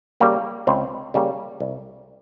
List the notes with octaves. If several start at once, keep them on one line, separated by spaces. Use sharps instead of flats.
C#3 G3 A#3
C#2 C4
C#3 G3 A#3
C2